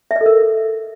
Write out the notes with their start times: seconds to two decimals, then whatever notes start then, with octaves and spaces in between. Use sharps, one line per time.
0.11 E5
0.16 D#5
0.21 A4
0.26 A#4